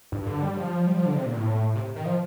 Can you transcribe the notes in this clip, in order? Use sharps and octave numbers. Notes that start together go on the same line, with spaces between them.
G2
D3
G3
F3
G3
F3
D3
C3
A#2
A2
C3
D#3
F3